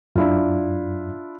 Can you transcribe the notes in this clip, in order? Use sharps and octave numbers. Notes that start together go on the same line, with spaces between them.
F#2 D4 E4 F4